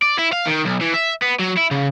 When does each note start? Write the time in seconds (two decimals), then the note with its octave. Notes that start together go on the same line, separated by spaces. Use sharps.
0.02 D5
0.19 E4
0.33 F5
0.47 D#3
0.65 B1
0.81 E3
0.94 E5
1.22 B3
1.39 F#3
1.57 E4
1.71 C#3